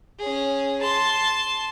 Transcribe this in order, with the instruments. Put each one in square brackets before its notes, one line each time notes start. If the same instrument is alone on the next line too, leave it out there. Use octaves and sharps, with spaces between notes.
[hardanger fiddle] C#4 G#4
A5 C6